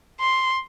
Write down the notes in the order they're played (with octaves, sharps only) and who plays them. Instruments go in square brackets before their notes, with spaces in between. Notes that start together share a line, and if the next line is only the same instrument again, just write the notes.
[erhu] C6